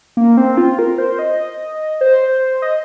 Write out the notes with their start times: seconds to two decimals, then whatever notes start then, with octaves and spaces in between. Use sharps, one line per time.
0.17 A#3
0.37 C4
0.58 F4
0.79 A#4
0.98 C5
1.19 D#5
2.01 C5
2.62 D#5